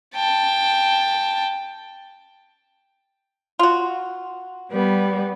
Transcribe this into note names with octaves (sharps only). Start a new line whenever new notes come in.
G5 A5
F4 F#4
G3 B3